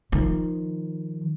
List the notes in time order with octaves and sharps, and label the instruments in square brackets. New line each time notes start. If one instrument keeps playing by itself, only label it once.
[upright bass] D#3 F3